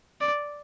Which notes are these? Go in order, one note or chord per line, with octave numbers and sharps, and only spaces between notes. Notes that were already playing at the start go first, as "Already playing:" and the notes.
D5